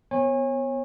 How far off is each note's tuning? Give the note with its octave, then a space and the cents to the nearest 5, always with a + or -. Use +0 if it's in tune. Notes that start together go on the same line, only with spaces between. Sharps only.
B3 +10 C#5 -30 G#5 -30